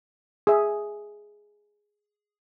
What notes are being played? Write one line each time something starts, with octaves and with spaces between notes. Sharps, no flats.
G#4 E5